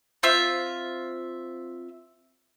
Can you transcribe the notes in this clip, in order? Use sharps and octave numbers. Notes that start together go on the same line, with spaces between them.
C4 F4 E5